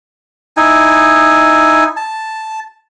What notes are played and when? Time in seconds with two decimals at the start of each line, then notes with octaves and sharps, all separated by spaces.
0.57 D#4 E4 G#5
1.97 A5